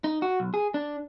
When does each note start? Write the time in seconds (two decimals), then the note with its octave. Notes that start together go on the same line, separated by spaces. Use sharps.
0.04 D#4
0.22 F#4
0.40 B1
0.54 G#4
0.74 D4